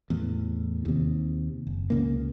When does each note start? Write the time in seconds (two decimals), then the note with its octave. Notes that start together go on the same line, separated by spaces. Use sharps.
0.10 E2 A2
0.85 D#2 C3
1.67 F#1
1.90 C#2 C#3 A#3